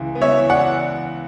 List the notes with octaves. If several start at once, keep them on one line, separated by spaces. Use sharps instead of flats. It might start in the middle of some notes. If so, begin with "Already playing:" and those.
Already playing: C#2 E3
B3
C#5 E5
E3
D5 F#5
E3